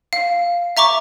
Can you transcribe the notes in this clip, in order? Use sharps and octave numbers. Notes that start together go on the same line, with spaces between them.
F5
E5 A#5 C#6 D6